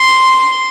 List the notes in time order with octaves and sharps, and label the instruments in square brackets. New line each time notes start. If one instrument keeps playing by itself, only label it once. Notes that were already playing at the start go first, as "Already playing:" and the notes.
Already playing: [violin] C6